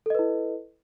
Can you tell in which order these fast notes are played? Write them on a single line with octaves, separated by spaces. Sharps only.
A4 D#5 B4 E4